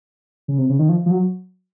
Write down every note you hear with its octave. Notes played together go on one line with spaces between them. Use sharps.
C#3
C3
C#3
D#3
F3
F3
F#3